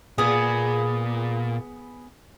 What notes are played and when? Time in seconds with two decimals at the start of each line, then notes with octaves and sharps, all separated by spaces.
0.18 A#2 B3 G#4